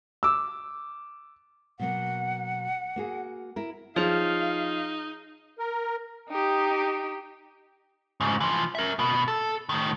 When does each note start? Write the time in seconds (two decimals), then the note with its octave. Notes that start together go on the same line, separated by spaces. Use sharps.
0.23 D6 E6
1.80 B2 F#3 A#3 F#5
2.96 A#3 F#4 G#4
3.56 E4 A#4
3.96 F3 D#4 G#4 C#5 F5
5.59 A#4
6.29 D#4 G4
8.21 G#2 C#3
8.40 E3 F3
8.75 A#4 E5
8.99 B2 B3
9.28 A4
9.69 A2 D#3